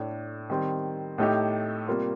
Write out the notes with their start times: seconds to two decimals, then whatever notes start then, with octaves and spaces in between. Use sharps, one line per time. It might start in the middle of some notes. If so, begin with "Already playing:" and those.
Already playing: A2 A3 D4
0.50 D#3 G3 C4
1.18 A2 A3 D#4 G4
1.88 C3 G3 A#3 F4